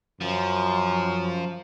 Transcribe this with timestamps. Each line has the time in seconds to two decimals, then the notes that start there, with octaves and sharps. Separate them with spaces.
0.21 F#2 F3